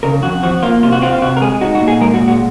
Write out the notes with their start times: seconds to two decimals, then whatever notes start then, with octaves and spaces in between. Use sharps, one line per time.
0.03 C#3 A#4
0.23 F2 F#4
0.43 F3 F#4
0.63 A#3 F4
0.83 C3 F4
0.92 F#4
1.02 C4 F4
1.13 F4
1.22 C3 F#4
1.37 A#4
1.41 G#3 G#4
1.61 D#4 F#4
1.75 F#4
1.81 A#2
1.88 G#4
2.01 G#3 A#4
2.14 F#4
2.20 A#2
2.28 F#4